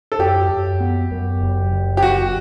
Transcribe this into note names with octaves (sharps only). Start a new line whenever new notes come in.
A4
F#2 G4
F#2
B3
F#2
F#1
F#1
G4
F#2 F#4